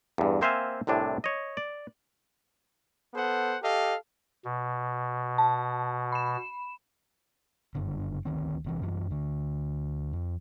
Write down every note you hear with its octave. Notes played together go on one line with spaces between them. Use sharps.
E2 G2
A#3 C4 C5 E5 F5 G#5
C2 A2 C3 D4 G#5
C#5 D#5
D5
B3 A4 C5 F#5
G4 A4 D#5 F5
B2
A5
B5 E7
F#1 G2 D3
D2 D#3 C4
F#1 C3 E3
F#2 E3 G3
D2 D3
F2